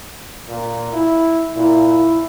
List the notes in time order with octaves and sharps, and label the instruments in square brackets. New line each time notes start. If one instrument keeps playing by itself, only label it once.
[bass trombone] A#2
E4
[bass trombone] A#2 [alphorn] E4